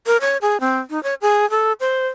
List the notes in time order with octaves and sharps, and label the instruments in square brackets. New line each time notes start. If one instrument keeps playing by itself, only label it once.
[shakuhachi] A#4
C#5
G#4
C4
D#4
C#5
G#4
A4
C5